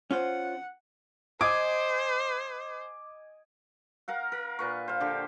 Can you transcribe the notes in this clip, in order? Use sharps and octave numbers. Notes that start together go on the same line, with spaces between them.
C#4 F4 C5 F#5
C5 D#5 G#5 D6
A#4 F5 F#5
A#4
A#2 B4 C#6
C5 F5
D3 G4